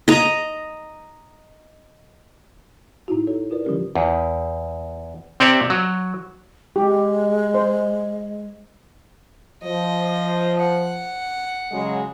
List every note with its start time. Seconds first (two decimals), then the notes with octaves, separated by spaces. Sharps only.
0.08 D#5 A#5
3.08 A2 D#4 E4 F#4
3.27 F#4 A4 C#5
3.50 E4 F4 A#4 B4 D5
3.65 D3 F3 G3 C#4 G4 A#4
3.95 E2
5.40 C3 C4 C#5 D5 E5
5.70 F#3
6.76 G#3 G4
7.54 C5
9.63 F3 D#5
10.60 F#5
11.72 C#3 F#3 G#3